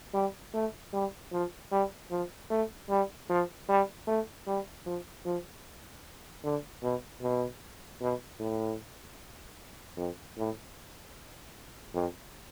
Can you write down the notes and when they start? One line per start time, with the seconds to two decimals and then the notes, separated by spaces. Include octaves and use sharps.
0.14 G3
0.54 A3
0.93 G3
1.32 F3
1.71 G3
2.11 F3
2.50 A3
2.89 G3
3.29 F3
3.69 G3
4.08 A3
4.47 G3
4.86 F3
5.25 F3
6.44 D3
6.83 B2
7.22 B2
8.01 B2
8.40 A2
9.97 F2
10.37 A2
11.94 F2